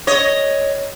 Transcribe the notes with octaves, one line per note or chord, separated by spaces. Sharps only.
C#5 D#5